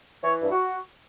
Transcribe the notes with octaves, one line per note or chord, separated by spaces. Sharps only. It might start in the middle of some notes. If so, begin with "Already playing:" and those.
E3 C#5
G2
F#4